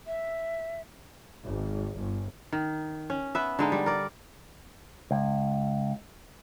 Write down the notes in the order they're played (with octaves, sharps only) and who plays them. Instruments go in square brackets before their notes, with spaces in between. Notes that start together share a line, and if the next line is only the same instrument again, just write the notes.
[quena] E5
[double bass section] G#1
G1
[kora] D#3
C#4
B3 B4 E5
D3 G#3 D#4
G3
A#4 D5
[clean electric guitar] C#2